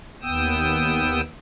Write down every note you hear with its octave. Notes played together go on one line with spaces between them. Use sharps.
D#2 B3 G5 D#6 E6